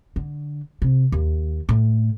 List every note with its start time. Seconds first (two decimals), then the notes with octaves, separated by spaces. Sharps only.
0.16 D3
0.82 C3
1.12 D#2
1.69 A2